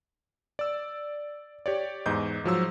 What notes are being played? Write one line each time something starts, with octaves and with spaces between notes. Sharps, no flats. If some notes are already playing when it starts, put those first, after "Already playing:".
D5 E6
G4 C#5 D5
E2 G#2 D#5 G6
G#2 F3 F#3 E6